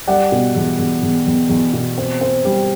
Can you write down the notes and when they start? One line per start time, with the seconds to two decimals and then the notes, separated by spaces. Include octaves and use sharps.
0.07 G3 D5 F#5
0.32 B2
0.56 E2
0.79 E2
1.03 E2
1.27 E2
1.49 E2
1.73 B2
1.98 C4
2.21 C4
2.45 G3